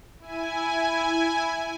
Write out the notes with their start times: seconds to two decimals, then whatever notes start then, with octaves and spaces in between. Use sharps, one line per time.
0.19 E4 G#5